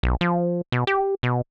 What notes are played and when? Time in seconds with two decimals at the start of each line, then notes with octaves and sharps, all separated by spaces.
0.03 B1
0.21 F3
0.72 B2
0.87 G4
1.23 B2